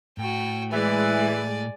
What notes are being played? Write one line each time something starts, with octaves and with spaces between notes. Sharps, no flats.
A2 F#4 G5
E3 G#3 D5 G#5